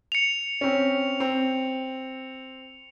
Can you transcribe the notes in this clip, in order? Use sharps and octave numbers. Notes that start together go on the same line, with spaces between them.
C#7 F7
C4 C#4
C4